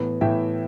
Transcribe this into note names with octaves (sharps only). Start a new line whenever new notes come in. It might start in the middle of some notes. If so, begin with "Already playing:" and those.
Already playing: A2 E3 B3
A2 E3 B3 E5 G5